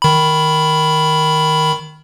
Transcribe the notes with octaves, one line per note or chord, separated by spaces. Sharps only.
D#3 B5